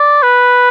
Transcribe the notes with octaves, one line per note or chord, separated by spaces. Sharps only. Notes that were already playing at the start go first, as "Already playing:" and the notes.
Already playing: D5
B4